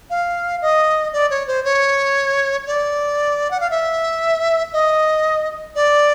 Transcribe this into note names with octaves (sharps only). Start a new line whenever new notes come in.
F5
D#5
D5
C#5
C5
C#5
D5
F#5
F5
E5
D#5
D5